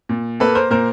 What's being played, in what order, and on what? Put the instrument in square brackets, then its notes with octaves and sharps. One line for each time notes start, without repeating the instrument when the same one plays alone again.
[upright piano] A#2
A#3 A4 B4
A#4 C5
A#2 A#4 C5